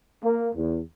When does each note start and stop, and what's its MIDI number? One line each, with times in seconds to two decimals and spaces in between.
0.23 0.49 58
0.54 0.79 40